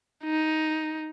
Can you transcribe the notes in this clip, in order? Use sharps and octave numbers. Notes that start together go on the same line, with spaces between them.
D#4